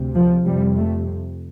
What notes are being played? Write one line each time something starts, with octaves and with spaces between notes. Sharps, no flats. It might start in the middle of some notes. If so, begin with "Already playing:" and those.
Already playing: D2 C3
F3
F2 C3 G3
A3